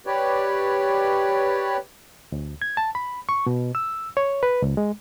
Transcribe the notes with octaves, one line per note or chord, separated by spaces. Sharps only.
G4 B4 C#5 D5
D2
G#6
A5
B5
C#6
B2
E6
C#5
B4
C#2
G#3